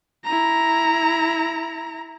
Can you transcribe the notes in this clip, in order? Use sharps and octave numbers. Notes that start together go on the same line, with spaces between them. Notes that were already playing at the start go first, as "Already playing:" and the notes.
E4 A#5